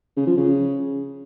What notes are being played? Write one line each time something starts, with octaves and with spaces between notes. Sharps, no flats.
C#3
F3
C#3